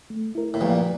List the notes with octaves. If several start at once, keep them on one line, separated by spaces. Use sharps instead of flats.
A3
E4 A#4
A2
G2 A#2 F3